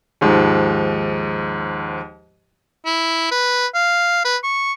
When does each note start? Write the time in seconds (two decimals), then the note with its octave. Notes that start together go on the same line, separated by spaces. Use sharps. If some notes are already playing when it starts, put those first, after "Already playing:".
0.21 D#2 G#2 F3
2.85 E4
3.31 B4
3.74 F5
4.25 B4
4.43 C#6